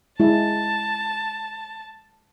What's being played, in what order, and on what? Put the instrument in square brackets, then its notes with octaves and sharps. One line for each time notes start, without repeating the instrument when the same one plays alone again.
[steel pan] G#3 E4 [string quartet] A5